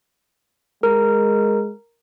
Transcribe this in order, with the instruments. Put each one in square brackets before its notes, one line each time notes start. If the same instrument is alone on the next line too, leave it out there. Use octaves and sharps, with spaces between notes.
[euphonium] G#3 [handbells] A#4